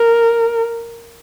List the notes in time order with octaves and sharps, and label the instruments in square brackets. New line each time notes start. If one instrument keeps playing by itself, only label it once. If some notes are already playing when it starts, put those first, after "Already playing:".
Already playing: [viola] A#4